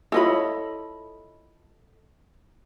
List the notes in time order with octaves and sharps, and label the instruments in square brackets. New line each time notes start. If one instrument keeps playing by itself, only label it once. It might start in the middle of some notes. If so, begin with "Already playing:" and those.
[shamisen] E4 F4 C#5 [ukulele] A4 D#5 B5